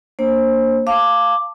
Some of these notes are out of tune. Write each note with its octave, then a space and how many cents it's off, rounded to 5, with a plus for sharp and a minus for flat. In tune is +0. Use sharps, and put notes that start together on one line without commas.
A#3 +0 D4 +0 C5 +30
F5 +0 A5 +20 D6 +0